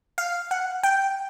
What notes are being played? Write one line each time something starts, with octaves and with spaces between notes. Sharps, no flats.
F5
F#5
G5